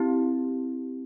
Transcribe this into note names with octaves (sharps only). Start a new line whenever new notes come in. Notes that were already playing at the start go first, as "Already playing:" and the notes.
Already playing: C4 E4 G4